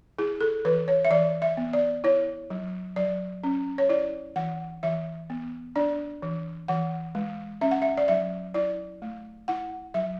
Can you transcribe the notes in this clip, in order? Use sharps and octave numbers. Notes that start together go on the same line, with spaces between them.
E4 G#4
A4
E3 B4
C#5
E5
E3 D5
E5
B3
D5
E4 C#5
F#3
F#3 D5
C#4
C#5
E4 D5
E3 F#5
E3 E5
B3
D4 D5
E3
E3 F#5
G#3
C#4 E5
F#5
E5
D5
F#3 E5
E4 D5
A3
E4 F#5
F#3 E5